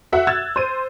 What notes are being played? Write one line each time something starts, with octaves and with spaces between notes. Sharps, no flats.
F#4 E5 F#5
E6 F#6 G#6 A6 E7
C5 D#7